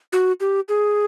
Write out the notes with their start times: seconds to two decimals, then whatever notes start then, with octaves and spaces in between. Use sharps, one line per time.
0.13 F#4
0.40 G4
0.69 G#4